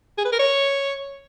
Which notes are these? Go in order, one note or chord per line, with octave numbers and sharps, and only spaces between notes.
G#4
B4
A#4
C#5